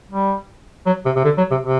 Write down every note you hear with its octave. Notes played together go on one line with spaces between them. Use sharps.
G3
F#3
C3
C3
D3
F#3
C3
C3